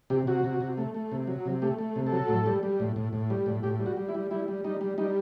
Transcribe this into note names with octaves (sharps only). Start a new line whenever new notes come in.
C3 G4
C3 F#4
C3
C3
A3
A3
C3
F#3
C3
A3 G4
A3
C3
A4
F#3
A2
G3
G3
A2
A2
A2
G3
A2
A2 G4
G3
F#4
G3
E4
G3
G3 E4
G3
G3 D#4
G3
G3 D#4